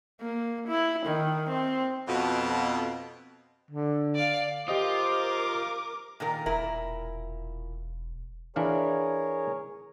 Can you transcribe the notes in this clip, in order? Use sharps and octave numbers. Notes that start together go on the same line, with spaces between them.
A#3
E4
D#3
C4
F2 B2
D3
D5 F5
F4 G4 A#4 C5 D#5 D6 D#6
A#2 D#3 A#4
E1 A#2 E4 A#4
E3 D4 G#4 A#4 C#5 F5